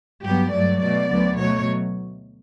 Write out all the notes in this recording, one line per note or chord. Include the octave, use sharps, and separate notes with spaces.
G2 F#3 B3 G4
G2 F#3 A3 D5
B2 A3 D5
D2 D3 F#3 B3
B2 F#3 A3 C#5